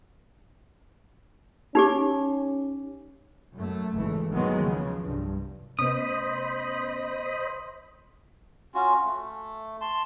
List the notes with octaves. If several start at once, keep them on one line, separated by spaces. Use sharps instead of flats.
C#4 D#4 G4 D6
F#2 A3
G#1 C#2 E3 A3
D#2 D#3 E3 F#3 G#3 B3
C#3 F3
C2 G2
C3 A3 B3 C#4 C5 D#5 B5 D#6
C#4 F4 F#4
A3
A5 C6